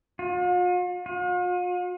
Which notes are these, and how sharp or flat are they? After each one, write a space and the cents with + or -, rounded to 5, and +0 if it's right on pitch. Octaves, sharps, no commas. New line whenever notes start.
F4 +45
F4 +45